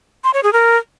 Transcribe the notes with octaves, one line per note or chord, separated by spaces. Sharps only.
C6
C#5
G#4
A#4